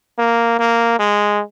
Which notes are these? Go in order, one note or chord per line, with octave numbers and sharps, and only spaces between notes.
A#3
A#3
G#3